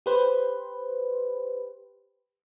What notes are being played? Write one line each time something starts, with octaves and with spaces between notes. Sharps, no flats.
G4 B4 C5